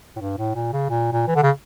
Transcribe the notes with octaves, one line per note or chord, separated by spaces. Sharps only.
A2
G2
A2
A#2
C#3
A#2
A#2
E3
D3
C#3